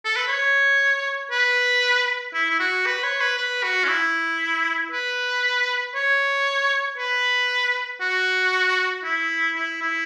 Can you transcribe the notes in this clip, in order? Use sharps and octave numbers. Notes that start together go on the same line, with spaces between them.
A4
B4
C#5
B4
E4
E4
F#4
B4
C#5
B4
B4
F#4
C#4
E4
B4
C#5
B4
F#4
E4
E4
E4